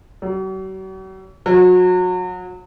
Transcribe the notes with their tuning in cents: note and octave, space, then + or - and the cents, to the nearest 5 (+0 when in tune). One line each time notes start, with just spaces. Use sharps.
F#3 +45
F#3 -30